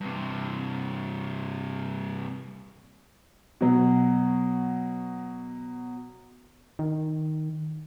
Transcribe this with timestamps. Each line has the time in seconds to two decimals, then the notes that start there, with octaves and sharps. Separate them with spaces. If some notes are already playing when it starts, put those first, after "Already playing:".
0.01 G2 C3
3.61 B2 F#3
6.79 D#3